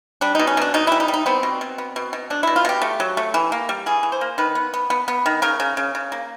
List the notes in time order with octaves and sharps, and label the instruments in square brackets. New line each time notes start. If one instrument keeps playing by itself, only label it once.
[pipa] G3 D4
B2 D#4
C#4
B2 D4
B2 D#4
G3 E4
D#4
G3
D#4
B3 C4
B2
B2
B3
B2
B2
B2 D4
B2 E4
F4
B2 G4
A3
F#3
A3
E3
A#3
G3
E3 G#4
E3
C5
A#3
D#3 B4
B3
B3
B3
B3
D#3
C#3 A#4
C#3
C#3
C#3
A#3